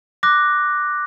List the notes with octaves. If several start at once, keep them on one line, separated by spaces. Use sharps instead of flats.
D6 F#6 A#6